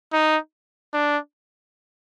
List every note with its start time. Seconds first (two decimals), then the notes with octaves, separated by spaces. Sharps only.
0.13 D#4
0.94 D4